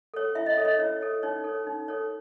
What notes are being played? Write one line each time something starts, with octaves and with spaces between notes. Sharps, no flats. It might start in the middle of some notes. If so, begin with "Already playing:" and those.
A4 C#5
E4 E5
D#5
E5
A4 C#5
D#5
E4 C#5
A4 C#5
D#4 C#5
A4 C#5
D#4
A4 C#5